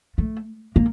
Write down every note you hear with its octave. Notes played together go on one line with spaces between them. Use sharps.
A3
A#3